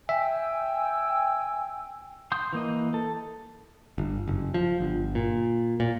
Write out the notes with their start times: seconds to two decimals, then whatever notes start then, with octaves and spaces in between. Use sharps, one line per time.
0.09 E5 G5 G#5 E6
2.32 C6 D#6 G6
2.53 E3 A#3 D#5
2.94 A4
3.98 G1
4.28 F#1
4.54 F3
4.80 G1
5.15 A#2
5.80 A#2